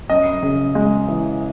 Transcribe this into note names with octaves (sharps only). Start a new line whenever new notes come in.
F#2 D#5
C#3
G#3
E3